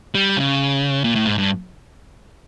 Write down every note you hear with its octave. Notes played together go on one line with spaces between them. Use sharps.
G3
C#3
A#2
A2
G#2
G2